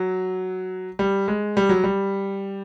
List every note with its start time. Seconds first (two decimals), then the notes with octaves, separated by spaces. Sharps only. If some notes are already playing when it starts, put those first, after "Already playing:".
Already playing: F#3
0.99 G3
1.28 G#3
1.57 G3
1.69 F#3
1.84 G3